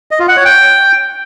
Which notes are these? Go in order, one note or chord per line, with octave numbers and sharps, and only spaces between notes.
D#5
F4
F#5
C#5
G5